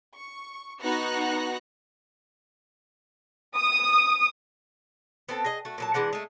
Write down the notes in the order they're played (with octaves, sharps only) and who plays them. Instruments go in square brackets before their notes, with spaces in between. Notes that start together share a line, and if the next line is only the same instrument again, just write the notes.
[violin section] C#6
B3 D#4 F#4 F#6 A#6 C#7
[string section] D#6
[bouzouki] B3 C4 A4
G#4 D#5
A3 F#4
A#2 F#3 A5
E3 G#3 D4 F#5
G#3 A3